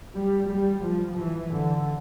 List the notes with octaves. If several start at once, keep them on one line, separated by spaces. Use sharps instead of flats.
G3
G3
F3
E3
D3